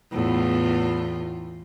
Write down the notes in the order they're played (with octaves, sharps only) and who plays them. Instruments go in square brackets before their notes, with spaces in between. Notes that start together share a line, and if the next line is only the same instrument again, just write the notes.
[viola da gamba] E2 A2 F4